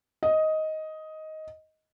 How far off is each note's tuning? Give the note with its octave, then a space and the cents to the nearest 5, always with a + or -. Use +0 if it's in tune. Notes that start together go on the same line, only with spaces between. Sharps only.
D#5 +10